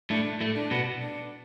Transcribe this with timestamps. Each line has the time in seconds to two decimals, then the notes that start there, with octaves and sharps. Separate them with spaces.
0.10 A2 A3 D4
0.40 A2 A3
0.56 D4
0.71 B2 B3
1.02 D4